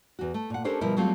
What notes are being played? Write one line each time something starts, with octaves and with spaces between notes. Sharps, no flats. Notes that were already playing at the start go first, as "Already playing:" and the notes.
E2 F#4
A3
A#2 F#5
C#4 D4 G4 A4 A#4 C5
B2 F3 G3 E4 A#4
F#3 G3 A3 C4 F4